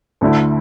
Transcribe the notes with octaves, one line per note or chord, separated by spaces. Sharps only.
D2 D3 A3 E4